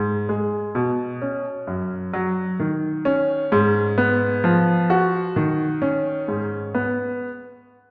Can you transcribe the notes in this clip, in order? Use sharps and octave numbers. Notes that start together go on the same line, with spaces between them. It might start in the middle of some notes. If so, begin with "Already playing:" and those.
Already playing: G#2
G#3
B2
C#4
F#2
F#3
D#3
C#4
G#2
B3
F3
F#4
D#3
C#4
G#2
B3